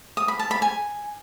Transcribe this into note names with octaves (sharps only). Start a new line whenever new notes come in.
D#6
B5
A5
B5
G#5